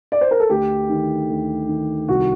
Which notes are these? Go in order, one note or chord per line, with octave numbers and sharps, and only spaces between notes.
D5
C5
A#4
A4
D2 G4
D#3
D2
D#3
C2 F#4